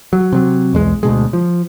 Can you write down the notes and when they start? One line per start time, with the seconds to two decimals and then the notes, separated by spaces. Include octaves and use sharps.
0.13 F#3
0.33 C3 F#3
0.73 B1 E2 G#3
1.03 D2 B2 G#3
1.33 F3